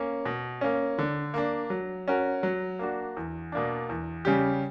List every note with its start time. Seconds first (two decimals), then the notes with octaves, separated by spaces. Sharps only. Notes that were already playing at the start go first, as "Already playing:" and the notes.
Already playing: A#3 C#4
0.25 B2
0.61 A#3 C#4
0.98 D3
1.34 A#3 D4
1.70 F#3
2.08 C#4 F#4 A#4
2.43 F#3
2.79 A#3 D4 F#4
3.17 E2
3.52 B2 A#3 D4
3.89 E2
4.25 C#3 G3 C#4 G4